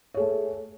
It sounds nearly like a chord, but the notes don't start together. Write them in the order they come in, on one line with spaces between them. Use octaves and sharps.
C#5 G#4 A3